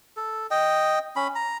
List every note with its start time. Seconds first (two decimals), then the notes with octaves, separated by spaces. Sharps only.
0.16 A4
0.51 D#5 G5
1.16 C#4 B5
1.35 A#5